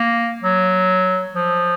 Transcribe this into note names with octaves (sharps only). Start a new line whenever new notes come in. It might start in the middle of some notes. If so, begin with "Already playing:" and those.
Already playing: A#3
F#3
F3